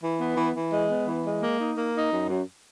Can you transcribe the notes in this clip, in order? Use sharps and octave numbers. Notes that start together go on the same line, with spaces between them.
E3
B3
E3
E3
G#3
B3
E3
G#3
A#3
D#4
A#3
D#4
F#2
F#2